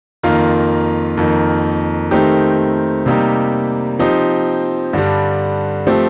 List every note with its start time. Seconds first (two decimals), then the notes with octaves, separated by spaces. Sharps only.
0.23 F2 D#3 A#3 F4
1.17 F2 D#3 A#3
2.11 D#3 A3 C4 D#4 G4
3.06 C3 G3 A#3 D#4 G4
3.99 F3 C4 D#4 G4
4.93 G2 D3 G3
5.87 F3 A3 C4 G4